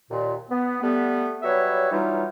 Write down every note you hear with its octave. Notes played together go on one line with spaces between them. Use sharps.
D#2 A#2
B3
G3 A3 B3
F#3 G3 B4 C#5 E5
E3 F#3 G3 D#4 F4